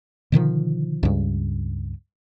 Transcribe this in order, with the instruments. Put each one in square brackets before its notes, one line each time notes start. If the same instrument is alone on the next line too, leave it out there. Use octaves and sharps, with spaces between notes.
[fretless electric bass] B2 D3 D#3 F3
C#2 G2